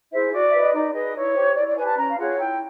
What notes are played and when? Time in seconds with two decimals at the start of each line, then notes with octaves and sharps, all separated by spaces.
0.11 E4 G#4 C5 E5
0.32 F#4 D5
0.50 B4 E5
0.61 D#5
0.73 D#4 D5
0.94 G#4 B4 D#5
1.14 E4 C#5
1.35 G4 C5
1.55 E4 D5
1.66 D5
1.76 G4 B4 G#5
1.87 A5
1.97 C#4 A#5
2.08 F5
2.17 F4 G#4 C#5 F#5
2.38 E4 G5